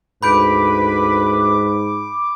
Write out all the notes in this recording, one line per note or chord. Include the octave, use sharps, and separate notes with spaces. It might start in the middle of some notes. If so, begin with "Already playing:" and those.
D2 G#2 B4 B5 D6 G6 D7